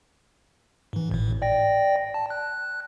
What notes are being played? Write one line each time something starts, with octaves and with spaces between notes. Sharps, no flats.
G#2 E3
G#1 A2
D5 G5 A#6
A5
F#6